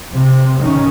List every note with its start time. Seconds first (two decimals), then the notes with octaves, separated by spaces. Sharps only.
0.15 C3
0.59 G2 D#3 C#4